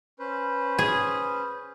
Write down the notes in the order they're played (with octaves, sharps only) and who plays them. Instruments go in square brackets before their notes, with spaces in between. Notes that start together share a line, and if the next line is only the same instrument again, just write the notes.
[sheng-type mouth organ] C#4 B4 C5
[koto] G#4